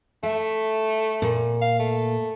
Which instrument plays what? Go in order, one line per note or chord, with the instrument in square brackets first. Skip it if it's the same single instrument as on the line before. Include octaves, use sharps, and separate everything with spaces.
[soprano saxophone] A3 [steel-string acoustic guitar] E5
[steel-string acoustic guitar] A#2
[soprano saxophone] F5
A3